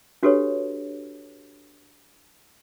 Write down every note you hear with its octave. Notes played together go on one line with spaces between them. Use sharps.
D4 F#4 G4 A4 B4 C#5